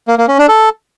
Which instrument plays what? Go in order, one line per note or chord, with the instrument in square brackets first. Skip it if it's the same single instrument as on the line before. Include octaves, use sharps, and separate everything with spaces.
[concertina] A#3
A#3
C#4
D4
A4